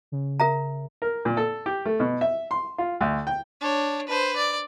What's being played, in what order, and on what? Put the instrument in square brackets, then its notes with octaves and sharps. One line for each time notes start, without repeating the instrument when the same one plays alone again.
[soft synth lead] C#3
[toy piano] A#4 E5 A#5
[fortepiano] A#4
A#2
A4
G4
A3
B2
E5
C6
F4
D2
G5
[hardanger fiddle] D4 C#5
B4 C5
D5